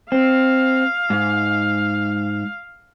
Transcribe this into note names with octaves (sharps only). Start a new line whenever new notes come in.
C4 F5
G#2